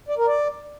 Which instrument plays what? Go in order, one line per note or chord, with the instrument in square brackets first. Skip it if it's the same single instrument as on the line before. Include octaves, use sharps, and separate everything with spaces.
[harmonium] D5
A#4
D5